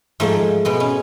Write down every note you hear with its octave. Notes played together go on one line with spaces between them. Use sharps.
G#2 F3 G#3 A3
B2 G#3 B3
C#4